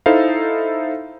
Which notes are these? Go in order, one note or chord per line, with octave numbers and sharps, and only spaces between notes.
D#4 E4 A4 C5 E5 F5